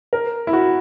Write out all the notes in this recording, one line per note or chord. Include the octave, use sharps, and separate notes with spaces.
A#4
E4
F#4